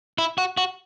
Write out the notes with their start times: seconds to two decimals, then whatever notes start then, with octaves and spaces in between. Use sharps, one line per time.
0.18 E4
0.38 F#4
0.57 F#4